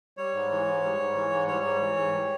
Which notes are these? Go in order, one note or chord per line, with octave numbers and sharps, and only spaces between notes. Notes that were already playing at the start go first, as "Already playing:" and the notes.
G3 C#5
G#2
E3
G#2
G3
G#2
E3
G#2
G3 C#5
G#2
E3
G#2
G3